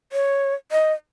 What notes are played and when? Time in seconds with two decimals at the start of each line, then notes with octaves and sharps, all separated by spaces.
0.12 C#5
0.72 D#5